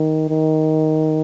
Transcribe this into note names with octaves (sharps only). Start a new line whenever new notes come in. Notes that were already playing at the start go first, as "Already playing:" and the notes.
Already playing: D#3
D#3